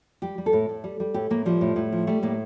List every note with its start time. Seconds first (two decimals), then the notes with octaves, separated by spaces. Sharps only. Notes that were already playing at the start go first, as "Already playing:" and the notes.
0.22 G3 G4
0.38 G3
0.46 A4
0.53 A2
0.69 A2
0.84 G3
1.00 G3
1.14 A2 G4
1.30 A2 A#3
1.46 F3 G3
1.61 A2
1.76 A2
1.92 F3
2.07 G3 A3
2.23 A2 A#3